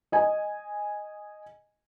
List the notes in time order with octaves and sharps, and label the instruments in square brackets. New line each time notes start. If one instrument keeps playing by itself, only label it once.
[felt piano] D#5 G#5